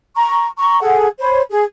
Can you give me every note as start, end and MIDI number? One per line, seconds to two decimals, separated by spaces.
0.16 0.47 82
0.16 0.47 85
0.58 0.79 82
0.58 0.79 85
0.82 1.06 68
0.82 1.06 69
0.82 1.06 78
1.20 1.42 72
1.20 1.42 73
1.20 1.42 83
1.50 1.64 68